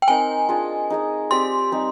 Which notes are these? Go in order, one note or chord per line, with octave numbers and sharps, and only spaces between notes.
G5
C4 D#4 A#4 D#5 G#5
D4 F4 G#4 D#5
D#4 G#4 D#5
C4 G4 D5 C6
G3 C4 D#4